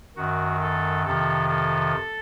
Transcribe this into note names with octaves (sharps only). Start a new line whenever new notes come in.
F#2 D#3 F#4
A4
F2 C3 D#3 A4
A4